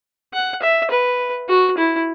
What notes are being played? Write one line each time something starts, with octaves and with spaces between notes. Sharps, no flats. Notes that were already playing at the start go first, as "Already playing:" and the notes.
F#5
E5
B4
F#4
E4